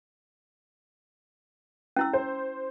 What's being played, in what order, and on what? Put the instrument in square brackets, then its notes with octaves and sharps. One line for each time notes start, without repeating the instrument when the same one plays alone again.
[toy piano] C#4 E4 E6
[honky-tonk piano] C5